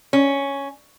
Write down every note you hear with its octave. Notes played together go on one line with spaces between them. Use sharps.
C#4